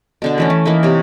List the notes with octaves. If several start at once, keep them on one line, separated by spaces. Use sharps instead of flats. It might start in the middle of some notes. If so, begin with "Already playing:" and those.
B2 D3 D4
E3 A3 C#4
E3
E3 A#3 D#4 E4
C3 C#5